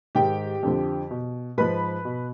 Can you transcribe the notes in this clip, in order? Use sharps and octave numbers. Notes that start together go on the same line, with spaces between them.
G#2 D#3 G4 G5
F2 D3 F3
B2
G#2 F3 B4 B5
B2